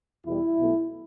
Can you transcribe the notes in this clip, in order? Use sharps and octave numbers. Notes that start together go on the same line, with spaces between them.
E2 B2 G3 E4
B1 B2 A3